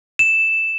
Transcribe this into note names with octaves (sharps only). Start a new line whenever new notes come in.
E7